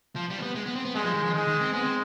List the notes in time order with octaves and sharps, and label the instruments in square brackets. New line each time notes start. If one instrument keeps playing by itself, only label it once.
[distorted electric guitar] F3
G3
C4
B3
G#3
B3
C4
B3
[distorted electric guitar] G3 [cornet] G#3
[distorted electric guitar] F3
D#3
F3
[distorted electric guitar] D#3 [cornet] G#3
[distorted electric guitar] D#3
C4
[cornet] G#3 [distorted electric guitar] B3
[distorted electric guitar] C4